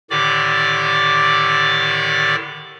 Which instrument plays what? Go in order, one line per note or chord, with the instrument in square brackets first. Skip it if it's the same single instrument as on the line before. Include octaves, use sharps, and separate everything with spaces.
[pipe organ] A2 D3 D#3 G4 D5 D6